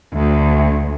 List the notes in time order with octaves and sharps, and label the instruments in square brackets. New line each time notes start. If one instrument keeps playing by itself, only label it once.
[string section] D2